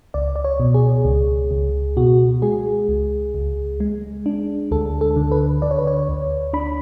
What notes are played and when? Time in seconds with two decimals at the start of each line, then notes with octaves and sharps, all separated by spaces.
0.14 C#2 D5
0.36 D5
0.44 C#5
0.60 B2
0.74 G#4
1.05 C#2
1.51 C#2
1.97 B2 F#4
2.42 G#3 G#4
2.89 C#2
3.34 C#2
3.80 G#3
4.26 D4
4.71 D2 A4
5.01 A4
5.16 D3
5.31 B4
5.62 D3 D5
5.71 C#5
5.79 B4
5.87 C#5
6.09 D2
6.53 D4 B5